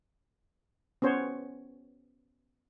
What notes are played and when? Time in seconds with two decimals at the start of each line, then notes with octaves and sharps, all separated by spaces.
1.02 B3 C#4 C5 C#5